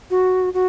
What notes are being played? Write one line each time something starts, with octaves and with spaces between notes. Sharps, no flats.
F#4
F#4